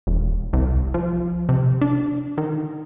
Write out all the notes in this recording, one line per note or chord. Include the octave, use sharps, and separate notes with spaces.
E1
C2
F3
C3
D4
D#3